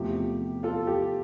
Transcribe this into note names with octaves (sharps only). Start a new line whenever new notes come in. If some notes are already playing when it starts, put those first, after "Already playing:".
Already playing: E2 C3 F3 A3 G4
F4 A4
G4